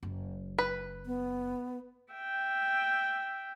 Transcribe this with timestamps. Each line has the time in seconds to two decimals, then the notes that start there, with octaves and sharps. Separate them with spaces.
0.03 F#1
0.59 B4
1.06 B3
2.13 E5 G5